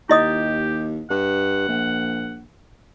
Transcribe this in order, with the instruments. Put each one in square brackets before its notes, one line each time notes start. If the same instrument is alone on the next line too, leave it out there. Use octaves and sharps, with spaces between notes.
[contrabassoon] D#2 [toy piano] E4 D#5 D#6 [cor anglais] G4
[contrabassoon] G2 [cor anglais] F#5
[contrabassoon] A#1